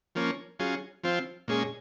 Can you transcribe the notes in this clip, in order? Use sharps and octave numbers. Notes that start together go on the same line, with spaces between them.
F3 A#3 C#4
F#3 C#4 F4 G#4
F3 C4 F4
A#2 G#3 C#4 G#4